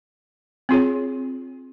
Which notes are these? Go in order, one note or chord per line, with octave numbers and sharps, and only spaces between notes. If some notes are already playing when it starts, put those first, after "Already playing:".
C4 F4 G#4 C#5